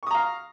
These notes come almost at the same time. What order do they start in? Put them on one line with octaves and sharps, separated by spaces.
C#6 D#6 A#5 F5